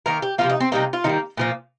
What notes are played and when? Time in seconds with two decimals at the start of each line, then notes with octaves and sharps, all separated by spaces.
0.06 D#3 A#3 A#4
0.22 G4
0.38 C3 F3 A#3 F4
0.49 D#4
0.60 C4
0.72 C3 G3 A#3 D#4
0.93 F4
1.04 D#3 G3 A#3 D#4
1.37 A#2 F3 A#3